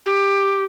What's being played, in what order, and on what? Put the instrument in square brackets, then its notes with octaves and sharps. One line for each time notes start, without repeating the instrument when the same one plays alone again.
[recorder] G4